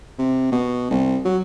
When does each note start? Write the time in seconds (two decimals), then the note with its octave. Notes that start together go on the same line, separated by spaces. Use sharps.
0.18 C3
0.52 B2
0.90 C2
1.25 F#3